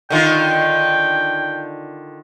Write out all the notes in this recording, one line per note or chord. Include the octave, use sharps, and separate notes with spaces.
D3 D#3 F4 G5